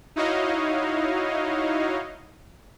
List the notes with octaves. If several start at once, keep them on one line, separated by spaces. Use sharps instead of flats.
D#4 E4 F#4 C#5 D#5 F5